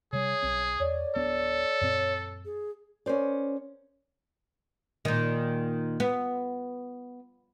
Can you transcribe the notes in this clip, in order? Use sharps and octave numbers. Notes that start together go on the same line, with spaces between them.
C3 G3 G#4 C#5
B1 C4
E2 C#5 D5
D1 B3 D4 A4
F#2 A#2 C4
G#4
C#4 A#4 C5 D5
A#2 D#3
B3